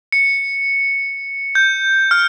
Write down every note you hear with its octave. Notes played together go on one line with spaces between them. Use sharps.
C#7
G6
F6